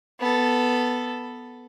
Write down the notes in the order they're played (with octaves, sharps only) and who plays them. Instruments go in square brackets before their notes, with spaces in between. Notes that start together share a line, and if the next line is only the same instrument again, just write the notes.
[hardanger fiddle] B3 A4